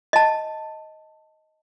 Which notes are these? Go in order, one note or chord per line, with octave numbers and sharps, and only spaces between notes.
D#5 A5